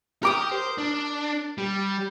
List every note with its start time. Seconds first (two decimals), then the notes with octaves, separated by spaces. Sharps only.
0.23 G4 A#4 D6 D#6
0.51 C5
0.78 D4
1.58 G3